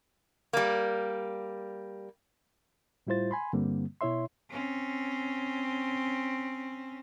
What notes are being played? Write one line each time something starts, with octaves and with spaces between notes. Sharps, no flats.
G3 A#3
A2 G3 E4 F4 C5 A6
G#5 B5 C6
G2 D3 G3 A#3 C4
B2 E4 C#5 E5 C6
C4 C#4